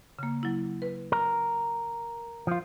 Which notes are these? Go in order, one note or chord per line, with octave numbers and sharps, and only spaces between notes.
C#3 A#3
F#3 E4
B4
A#4
F3 F4